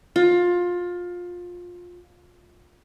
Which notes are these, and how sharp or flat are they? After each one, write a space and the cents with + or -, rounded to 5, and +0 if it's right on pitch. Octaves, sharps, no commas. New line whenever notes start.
F4 +20